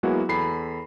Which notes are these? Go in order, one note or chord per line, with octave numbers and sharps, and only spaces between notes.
F#3 G#3 A#3 B3 E4 F#4
E2 A4 B5 C7